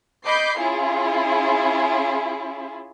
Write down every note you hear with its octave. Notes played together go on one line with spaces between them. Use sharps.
D#5 B5 D6 G6 C7
C#4 E4 F4 G#4